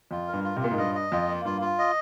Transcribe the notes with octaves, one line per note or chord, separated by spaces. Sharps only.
F2 F4
A#4
G2
F4
C3
A#2 F4
G#2
G2 D#5
D#5
F2 F4
A#3
G2 F4
F4
D#5